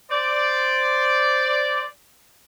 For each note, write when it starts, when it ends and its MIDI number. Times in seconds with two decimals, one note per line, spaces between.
0.10 1.84 72
0.10 1.84 74